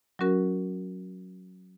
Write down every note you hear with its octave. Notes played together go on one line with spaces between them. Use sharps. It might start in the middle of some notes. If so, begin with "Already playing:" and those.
F#3 C#4 F#4 A#4